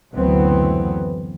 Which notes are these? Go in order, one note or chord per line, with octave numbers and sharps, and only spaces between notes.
F#1 D2 E3 F#3 B3 C4